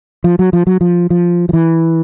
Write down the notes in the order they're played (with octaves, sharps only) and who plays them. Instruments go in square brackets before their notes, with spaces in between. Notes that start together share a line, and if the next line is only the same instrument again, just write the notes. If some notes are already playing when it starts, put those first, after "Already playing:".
[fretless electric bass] F3
F#3
F3
F#3
F3
F3
F3
E3